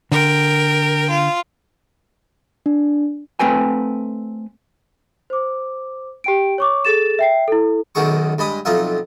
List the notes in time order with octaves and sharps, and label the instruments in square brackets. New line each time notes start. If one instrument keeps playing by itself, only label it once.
[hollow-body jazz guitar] D3 [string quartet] A#4 G5
[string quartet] F4
[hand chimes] D4
[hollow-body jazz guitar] A3 C4 B4 G5 G#5
[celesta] C5 D6
G4 G5 D7
C#5 C#6 D6
G#4 A4 A6 E7
E5 G5 C7
E4 A4
[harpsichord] B1 F#2 D#3 F#3 G#4 C#6
G2 G#3 B5 D#6
B1 F2 D#4 F4 E5